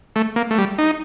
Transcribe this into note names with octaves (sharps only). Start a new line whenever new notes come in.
A3
A#3
A3
G3
D#4